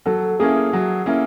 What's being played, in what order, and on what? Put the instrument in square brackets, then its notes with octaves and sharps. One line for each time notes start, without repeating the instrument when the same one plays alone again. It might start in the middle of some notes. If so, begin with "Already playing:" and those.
[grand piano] F#3 [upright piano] A4
[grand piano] A#3 C#4 E4 [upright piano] G#4
[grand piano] F#3
A#3 C#4 E4